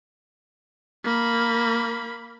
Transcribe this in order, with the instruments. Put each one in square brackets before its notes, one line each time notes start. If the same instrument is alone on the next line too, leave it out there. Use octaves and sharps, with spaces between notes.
[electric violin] A#3 B5